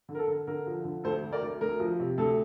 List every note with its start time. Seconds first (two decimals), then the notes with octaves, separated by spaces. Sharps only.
0.09 D3
0.15 A#4
0.19 A4
0.28 D3
0.47 D3 A#4
0.67 F3
0.85 D3
1.04 D2 A4 C5
1.23 D2
1.32 A#4 D5
1.42 D2
1.61 D2 A#4
1.80 F3
2.00 C3
2.18 D2 A4